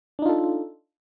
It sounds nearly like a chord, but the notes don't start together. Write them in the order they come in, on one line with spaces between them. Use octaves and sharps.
D4 D#4 F4 A4